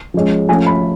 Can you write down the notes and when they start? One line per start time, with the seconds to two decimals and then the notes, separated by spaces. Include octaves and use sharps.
0.14 F3 G#3 C#4
0.49 F3 A3 C#4 G#5
0.66 B5